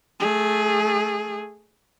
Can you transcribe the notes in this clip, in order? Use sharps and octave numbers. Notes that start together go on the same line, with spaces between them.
A3 G#4